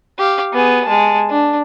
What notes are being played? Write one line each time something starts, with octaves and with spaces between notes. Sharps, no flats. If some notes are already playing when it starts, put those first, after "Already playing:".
G4 F5
B3 G#4
G#3 A5
D4